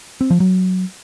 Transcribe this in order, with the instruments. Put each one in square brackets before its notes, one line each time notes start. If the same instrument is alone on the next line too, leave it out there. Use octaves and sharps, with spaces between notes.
[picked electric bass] C4
F3
F#3